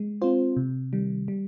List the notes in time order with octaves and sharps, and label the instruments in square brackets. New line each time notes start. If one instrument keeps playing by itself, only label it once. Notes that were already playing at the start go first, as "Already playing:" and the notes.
Already playing: [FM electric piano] G#3
C4 F4 C5
C3
D#3 G3
G3